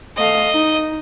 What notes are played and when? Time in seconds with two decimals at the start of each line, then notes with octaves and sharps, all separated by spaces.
0.17 A3 D#5 F5
0.53 D#4